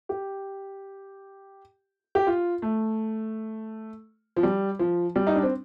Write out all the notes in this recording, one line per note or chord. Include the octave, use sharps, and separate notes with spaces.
G4
G4
F4
A3
F3
G3
F3
G3
D#4
D4
C4